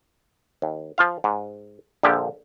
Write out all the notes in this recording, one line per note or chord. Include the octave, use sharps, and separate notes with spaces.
D#2
F3 F4 F5
G#2
A#1 A#2 D3 F3 G4